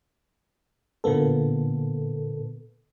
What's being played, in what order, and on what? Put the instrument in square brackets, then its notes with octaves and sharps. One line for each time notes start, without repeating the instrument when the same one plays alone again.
[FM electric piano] A#2 D3 A#3 B3 A4